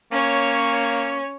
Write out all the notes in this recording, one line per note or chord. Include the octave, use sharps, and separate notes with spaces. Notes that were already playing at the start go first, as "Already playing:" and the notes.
A#3 C#4 C#5